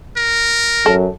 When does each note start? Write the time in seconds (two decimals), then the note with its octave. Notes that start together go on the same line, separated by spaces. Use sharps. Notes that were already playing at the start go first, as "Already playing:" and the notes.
0.17 A#4
0.86 F#2 A4